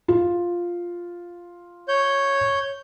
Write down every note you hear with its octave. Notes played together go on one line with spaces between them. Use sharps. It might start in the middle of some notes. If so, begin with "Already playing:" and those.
F4
C#5 G6